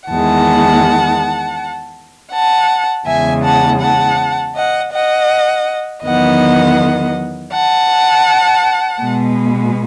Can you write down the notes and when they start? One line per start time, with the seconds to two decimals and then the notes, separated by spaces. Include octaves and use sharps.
0.10 E2 D#3 G#3 F#5 A5
2.33 F#5 A5
3.07 E2 C#3 G#3 E5 G#5
3.44 F#5 A5
3.82 F#5 A5
4.56 D#5 F#5
4.93 D#5 F#5
6.04 E2 D#3 F#3 B3 D#5 F#5
7.53 F#5 A5
9.01 B2 G#3 B3